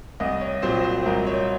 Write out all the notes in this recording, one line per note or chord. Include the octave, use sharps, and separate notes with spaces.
C2 D#5
C#5
A#2 F#3 C4 C5
C5
C2 A#4
C#5